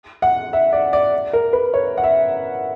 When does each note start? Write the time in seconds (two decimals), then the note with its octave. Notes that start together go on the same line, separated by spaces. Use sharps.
0.22 F#5
0.53 E5
0.73 D5
0.93 D5
1.33 A#4
1.53 B4
1.74 C#5
1.97 F#5
2.04 E5